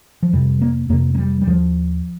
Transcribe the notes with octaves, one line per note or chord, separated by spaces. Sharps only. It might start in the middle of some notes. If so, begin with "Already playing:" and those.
F3
F2 C3 G3
A#3
F2 C3 A#3
A#3
G3
G3
D#2 F3